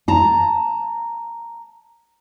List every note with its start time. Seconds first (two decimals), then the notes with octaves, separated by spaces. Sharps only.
0.08 A5 A#5